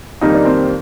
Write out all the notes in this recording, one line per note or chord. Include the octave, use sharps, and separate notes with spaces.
F2 D#3 G3 A#3 D#4
D4
C4